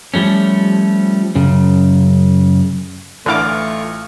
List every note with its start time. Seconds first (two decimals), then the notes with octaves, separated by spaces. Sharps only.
0.14 F3 G3 A3 C#4
1.35 F#2 C#3
3.26 A1 D3 E3 A3 F4 C#6 D6 F6